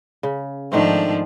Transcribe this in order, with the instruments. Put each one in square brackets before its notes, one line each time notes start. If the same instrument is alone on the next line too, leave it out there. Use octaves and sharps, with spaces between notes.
[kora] C#3
[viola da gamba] G#2 F3 D4 [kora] D#3 A3 C4